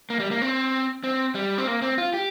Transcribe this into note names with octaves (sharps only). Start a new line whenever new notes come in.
A#3
G3
A#3
C4
C4
G3
C4
A#3
C4
F4
G4